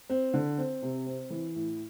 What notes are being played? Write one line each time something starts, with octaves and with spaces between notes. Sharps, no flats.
C4
D3
C4
C3
C4
E3
A2